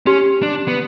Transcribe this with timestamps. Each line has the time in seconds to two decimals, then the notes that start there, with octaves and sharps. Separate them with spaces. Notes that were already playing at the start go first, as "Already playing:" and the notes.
0.06 C#4 G4
0.42 D4
0.68 B3